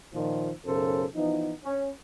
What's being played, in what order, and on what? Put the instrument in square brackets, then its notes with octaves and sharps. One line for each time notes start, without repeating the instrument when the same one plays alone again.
[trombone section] A#2 D#3 F3
B1 F#2 C#3 A4 A#4 C5
E3 F3 B3 D#4
C#4